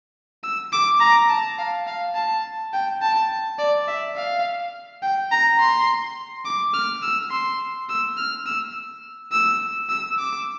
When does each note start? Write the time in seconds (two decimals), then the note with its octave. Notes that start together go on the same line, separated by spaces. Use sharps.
0.43 E6
0.73 D6
1.00 A#5
1.29 A5
1.59 F5
1.87 F5
2.15 A5
2.73 G5
3.01 A5
3.59 D5
3.88 E5
4.16 F5
5.03 G5
5.31 A#5
5.60 C6
6.45 D6
6.74 F6
7.02 E6
7.31 C6
7.89 E6
8.17 F6
8.46 E6
9.32 E6
9.89 E6
10.18 D6